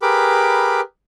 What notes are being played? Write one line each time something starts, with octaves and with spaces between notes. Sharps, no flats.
G4 G#4 A#4 B4 B5 D6